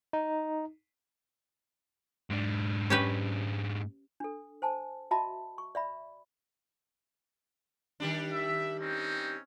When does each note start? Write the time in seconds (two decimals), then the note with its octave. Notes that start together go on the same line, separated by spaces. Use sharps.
0.13 D#4
2.30 G#2 D4
2.90 C#4 G4 B4
4.20 D4 A4
4.62 C5 G#5 A5
5.11 F#4 D#5 E5 A5 B5
5.58 C#6
5.75 D5 E5 B5
8.00 D#3 G3 D4
8.33 E5
8.81 C4 C#4 D#4